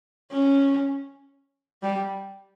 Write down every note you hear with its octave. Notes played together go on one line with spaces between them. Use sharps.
C#4
G3